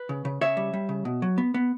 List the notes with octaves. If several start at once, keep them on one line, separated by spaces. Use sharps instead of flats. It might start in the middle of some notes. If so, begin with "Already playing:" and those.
Already playing: B4
C#3
C#3
C#3 C#5 E5
G3
G3
C#3
B2
F#3
B3
B3